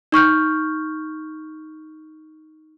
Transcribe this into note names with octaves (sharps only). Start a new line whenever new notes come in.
D#4 C#6 F6 G6